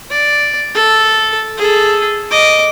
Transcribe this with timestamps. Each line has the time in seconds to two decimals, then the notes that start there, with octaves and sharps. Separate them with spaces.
0.10 D5
0.74 A4
1.58 G#4 A4
2.31 D#5 D6